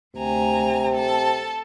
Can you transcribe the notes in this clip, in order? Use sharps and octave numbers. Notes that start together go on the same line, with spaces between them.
D2 C3 G#5 A#5
A4 A5